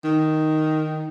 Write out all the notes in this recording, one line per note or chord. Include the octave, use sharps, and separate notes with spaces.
D#3